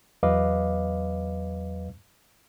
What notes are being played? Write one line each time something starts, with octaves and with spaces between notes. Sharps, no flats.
E2 F#3 B4 D#5 F5 D6